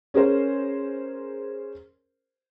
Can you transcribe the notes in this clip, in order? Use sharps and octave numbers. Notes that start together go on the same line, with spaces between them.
C#4 G#4 A#4 C5